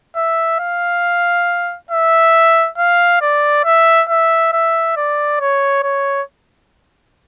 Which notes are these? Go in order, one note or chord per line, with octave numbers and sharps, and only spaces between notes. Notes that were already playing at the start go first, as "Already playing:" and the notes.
E5
F5
E5
F5
D5
E5
E5
E5
D5
C#5
C#5